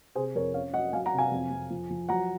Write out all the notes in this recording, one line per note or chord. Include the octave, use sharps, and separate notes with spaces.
C3 G#4 C5
F2 A#4 C#5
C#4 C#5 F5
F#3 D#5 F#5
F#3 F5 G#5
F#5 A#5
C3
F5 G#5
F2
F2
F3
F3
F#3 F#5 A#5